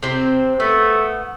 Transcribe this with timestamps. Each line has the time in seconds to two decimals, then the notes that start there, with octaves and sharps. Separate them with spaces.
0.03 C3 C4 C5
0.60 A3 B3